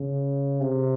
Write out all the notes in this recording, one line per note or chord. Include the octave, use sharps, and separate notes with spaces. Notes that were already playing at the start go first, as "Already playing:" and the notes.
Already playing: C#3
C3